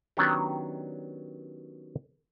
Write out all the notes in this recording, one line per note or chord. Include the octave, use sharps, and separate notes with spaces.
D#3 F#3 B3 C#4 D4 G4